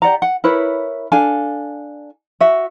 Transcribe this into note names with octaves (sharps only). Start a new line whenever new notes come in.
G4 D5 F#5 A#5
F#5
E4 A#4 B4 C#5
D4 A4 F5 G#5
F#4 E5